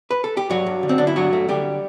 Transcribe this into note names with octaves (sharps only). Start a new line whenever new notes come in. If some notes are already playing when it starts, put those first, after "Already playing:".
B4
A4
G4
G2 F#3 F#4
G2
D3
C4
D3 D4
E4
G2 F#3 F#4
A3
D3 G3 G4